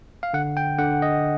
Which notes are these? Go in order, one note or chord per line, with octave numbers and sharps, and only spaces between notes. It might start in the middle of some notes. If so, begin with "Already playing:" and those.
F5
D3 F#5
G5
D3 F#5
D#5